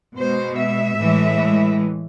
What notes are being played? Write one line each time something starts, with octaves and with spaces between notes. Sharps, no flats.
B2 G#3 C5
E5
A2 E3 G#3